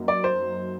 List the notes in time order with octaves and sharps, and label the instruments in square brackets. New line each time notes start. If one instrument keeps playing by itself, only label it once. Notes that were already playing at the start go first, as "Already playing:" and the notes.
Already playing: [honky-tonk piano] F#2 F#3 A#3 D#4
[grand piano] D5
C5